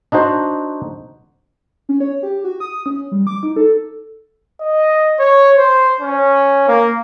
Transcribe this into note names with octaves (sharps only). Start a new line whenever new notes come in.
D4 D#4 F#4 C5
C#4
C#5
G4
F#4
D#6
C#4
G3
D6
D#4
A4
D#5
C#5
C5
C#4
A#3